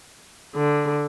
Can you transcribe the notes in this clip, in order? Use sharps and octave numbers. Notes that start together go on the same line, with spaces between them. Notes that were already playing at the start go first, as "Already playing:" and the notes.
D3